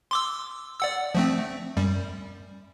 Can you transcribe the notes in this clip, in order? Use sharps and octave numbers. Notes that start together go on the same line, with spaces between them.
C6 D6 E6
D5 F#5 E6
F3 A3 C4
F#2 G3